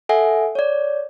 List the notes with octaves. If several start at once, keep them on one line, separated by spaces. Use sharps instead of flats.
A4 E5 F#5 G#5
C#5 D5